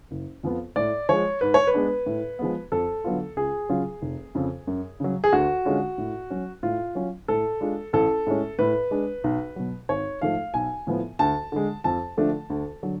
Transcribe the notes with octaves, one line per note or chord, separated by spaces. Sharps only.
F#1
F2 F3 B3 F4
A2 D5
F3 G#3 C#5
G#2 B4
C#5
B4
G#3 B3 D4
A2
F3 G#3 B3
F2 A4
D3 F#3 B3 F4
C#2 G#4
C#3 F#3 C#4 F4
F1
F2 C#3
F#2
C#3 F#3
G#4
D2 F#4
D3 G#3 C#4 F4
A2
F#3 C#4
A2 F4
F#3 C#4 F4
A2 A4
G#3 D4 F4
A1 A4
A2 G#3 C#4
A2 B4
G#3 D4
B1
B2 F#3
G#1 C#5
G#2 F3 A3 F5
B1 G#5
A2 F3 B3
D2 A5
D3 G#3
F2 A5
D3 F3 A3 D4
D2
D3 F#3